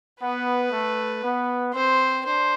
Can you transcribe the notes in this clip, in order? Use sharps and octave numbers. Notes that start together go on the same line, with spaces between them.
B3 B4
A3
B3
C4 C5
D4 C5